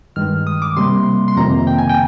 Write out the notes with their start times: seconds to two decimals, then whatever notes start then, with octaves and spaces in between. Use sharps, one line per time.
0.16 G2 D#3 G#3 F6
0.47 D#6
0.62 D6
0.76 C3 G3 A#3 C6
1.28 C6
1.36 F2 C3 D#3 A#3 A#5
1.67 G5
1.78 G#5
1.89 G5